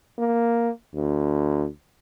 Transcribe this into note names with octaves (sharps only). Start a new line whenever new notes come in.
A#3
D2